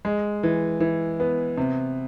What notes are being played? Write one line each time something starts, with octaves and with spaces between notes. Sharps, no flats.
G#3
E3
E3
B3
C3